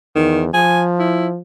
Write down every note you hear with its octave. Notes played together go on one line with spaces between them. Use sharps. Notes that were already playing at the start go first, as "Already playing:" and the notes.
E2 D#3
F3 G#5
E4